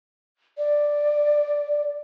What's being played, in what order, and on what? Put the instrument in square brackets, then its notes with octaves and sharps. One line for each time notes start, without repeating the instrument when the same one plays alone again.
[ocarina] D5